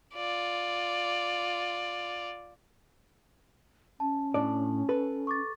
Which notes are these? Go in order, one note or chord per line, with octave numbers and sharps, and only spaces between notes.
F4 D5
C#4 A5
A2 D4 D5 A5
A4 B4
C#6 D6 A6